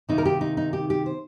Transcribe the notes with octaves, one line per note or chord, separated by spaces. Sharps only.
C3 D#3 A#3 D#4
A#4
G4
D#4
D#4
G4
G4
C5